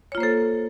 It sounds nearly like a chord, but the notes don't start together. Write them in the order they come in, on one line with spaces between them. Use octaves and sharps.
C#5 F4 A#3 C5 A4